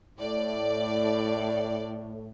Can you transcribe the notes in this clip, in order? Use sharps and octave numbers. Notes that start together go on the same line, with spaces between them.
A2 D5